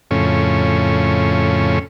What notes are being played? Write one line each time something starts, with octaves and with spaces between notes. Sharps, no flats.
F2 A2 C#3 C#4